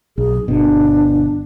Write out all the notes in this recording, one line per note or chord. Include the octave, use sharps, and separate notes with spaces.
B1 G#4
G1 B2 D4